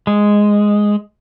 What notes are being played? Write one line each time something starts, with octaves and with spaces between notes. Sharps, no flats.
G#3